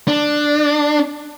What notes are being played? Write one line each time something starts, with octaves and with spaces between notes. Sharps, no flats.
D4